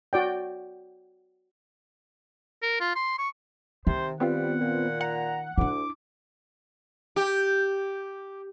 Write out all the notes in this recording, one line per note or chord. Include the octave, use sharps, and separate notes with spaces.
F#4 D5 G5
A#4
F4
C6
C#6
C3 D#3 C5
G3 B3 C4 F4 F#5
A#2
F#5 A#5
D2 D4 E4 D6
G4